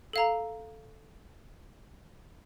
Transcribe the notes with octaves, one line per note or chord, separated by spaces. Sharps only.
A4 F5 A#5